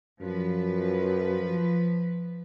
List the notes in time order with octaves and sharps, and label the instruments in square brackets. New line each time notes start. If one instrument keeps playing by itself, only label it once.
[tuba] F#2 [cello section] F3 B4